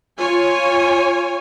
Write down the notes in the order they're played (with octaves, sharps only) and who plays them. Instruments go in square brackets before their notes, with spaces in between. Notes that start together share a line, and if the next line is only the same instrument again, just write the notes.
[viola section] F4 C#5 G#5